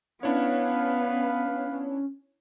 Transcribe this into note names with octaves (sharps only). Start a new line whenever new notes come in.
B3 C#4 D4 E4 B4 C#5 F5